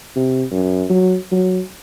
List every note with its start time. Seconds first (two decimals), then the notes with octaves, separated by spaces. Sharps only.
0.16 C3
0.52 F#2
0.90 F#3
1.32 F#3